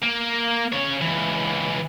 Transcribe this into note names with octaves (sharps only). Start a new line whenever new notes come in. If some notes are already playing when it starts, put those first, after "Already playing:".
A#3
C#3 C#5
C#2 E3